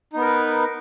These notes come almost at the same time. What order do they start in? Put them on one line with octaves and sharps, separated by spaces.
D#4 B3 A#4 B4